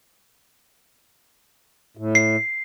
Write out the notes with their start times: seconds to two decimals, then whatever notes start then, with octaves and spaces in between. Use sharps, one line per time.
1.97 A2
2.15 C7